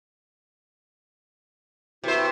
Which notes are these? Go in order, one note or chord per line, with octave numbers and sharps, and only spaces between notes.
C3 E4 F#4 B4 C5